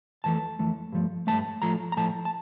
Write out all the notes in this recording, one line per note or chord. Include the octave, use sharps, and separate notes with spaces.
F2 E3 A3 A5
F2 E3 A3
G2 F3 A3
G2 F3 A3 A5
A2 F3 A3 A#5
A#5
A2 F3 A3 A5
A5